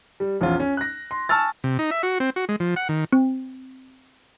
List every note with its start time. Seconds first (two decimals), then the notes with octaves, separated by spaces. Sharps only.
0.20 G3
0.41 A#1 E2 C#4 F4
0.60 C#4
0.77 F#6 A#6
1.11 C6
1.29 G#5 A5 C#6 E6 F6 A6
1.64 C3
1.79 D#4
1.91 E5
2.03 F#4
2.20 C4
2.36 F#4
2.49 G#3
2.60 F3
2.76 F#5
2.89 D#3
3.13 C4